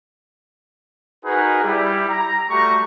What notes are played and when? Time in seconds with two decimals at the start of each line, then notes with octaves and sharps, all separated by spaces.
1.24 D#4 F#4 G#4 A#4 B4
1.63 G3 E4 G4
2.09 A#5
2.50 G3 A3 F#4 G4 A#5 C#6